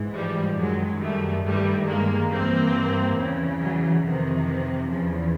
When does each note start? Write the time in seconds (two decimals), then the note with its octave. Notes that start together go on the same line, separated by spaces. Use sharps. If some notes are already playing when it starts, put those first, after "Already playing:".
Already playing: G#2 E3
0.14 F3 G3
0.57 F#2 D#3 F#3 G#3
1.01 G3 A3
1.44 G2 D#3 G3 A3
1.87 G#3 A#3
2.30 G2 E3 A#3 C4
3.17 E2 C#3 E3
3.60 E3 F#3
4.04 F2 C3 D#3 E3
4.90 E2 C#3 E3 F3